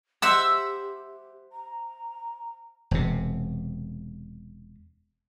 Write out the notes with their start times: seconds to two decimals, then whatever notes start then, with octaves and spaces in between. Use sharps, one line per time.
0.22 G4 C5 E5 F#5 E6
1.52 A#5
2.91 E1 C3